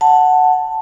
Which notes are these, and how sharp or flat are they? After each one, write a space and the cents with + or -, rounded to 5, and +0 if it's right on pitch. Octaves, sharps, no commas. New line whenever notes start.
F#5 +0 A5 +5